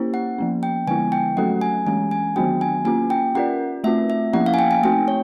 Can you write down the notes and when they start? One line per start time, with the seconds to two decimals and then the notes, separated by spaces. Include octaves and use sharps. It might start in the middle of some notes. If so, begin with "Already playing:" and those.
Already playing: A#3 C#4 E4 G4 C5
0.14 F#5
0.38 F3 A#3 C#4
0.63 G5
0.87 D3 F3 G#3 B3 E4 G#5
1.12 G5
1.37 F#3 A3 C#4 F#4 A4 F#5
1.61 G#5
1.87 E3 G#3 C#4 G#5
2.11 G#5
2.36 D#3 F#3 B3 D4 F#4 G5
2.61 G#5
2.85 A#3 C#4 F4 G#5
3.10 G5
3.35 C#4 F4 A#4 D5 F#5
3.84 A3 C4 F4 E5
4.10 E5
4.33 F3 A#3 C#4 E4 F#5
4.46 F5
4.54 G#5
4.59 G5
4.71 G#5
4.83 A3 C4 D#4 F#4 G5
5.08 C#5